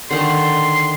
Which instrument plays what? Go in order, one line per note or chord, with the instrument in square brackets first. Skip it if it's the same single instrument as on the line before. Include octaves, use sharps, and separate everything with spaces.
[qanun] D3 D#3 A5 [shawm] C6